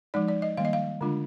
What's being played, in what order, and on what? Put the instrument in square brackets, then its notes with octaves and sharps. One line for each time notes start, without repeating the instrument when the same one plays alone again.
[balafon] F3 G#3 D#4 D5
D5
D#5
D#3 G3 A#3 F5
D#5
F5
D3 G#3 D4 F4